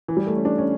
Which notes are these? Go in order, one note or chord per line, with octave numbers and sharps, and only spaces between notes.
E3
G3
A3
C#4
D4
C#4